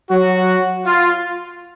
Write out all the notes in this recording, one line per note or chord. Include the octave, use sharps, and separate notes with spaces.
F#3 F#4
F4